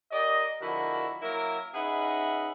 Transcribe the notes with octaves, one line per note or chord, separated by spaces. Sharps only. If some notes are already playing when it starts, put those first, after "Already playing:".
G4 A#4 D5 D#5
D3 F3 G#3 E4 F#4 A#4
F#3 A#3 E4 A#4
C#4 D#4 G#4 B4 E5 F#5